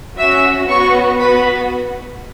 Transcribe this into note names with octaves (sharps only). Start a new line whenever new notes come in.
C#4 F#4 E5 E6
B3 F#4 C#5 C#6
B3 F#4 B4 B5